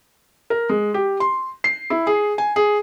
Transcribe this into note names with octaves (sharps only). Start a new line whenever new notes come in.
A#4
G#3
G4
C6
C7
E4
G#4
G#5
G#4